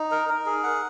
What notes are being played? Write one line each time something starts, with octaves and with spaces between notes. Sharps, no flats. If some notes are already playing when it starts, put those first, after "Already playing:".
Already playing: D#4
A#4
A#4
G#4
F#5